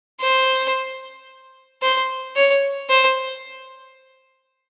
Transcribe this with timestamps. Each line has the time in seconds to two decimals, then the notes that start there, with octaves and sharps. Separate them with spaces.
0.20 C5
1.82 C5
2.36 C#5
2.89 C5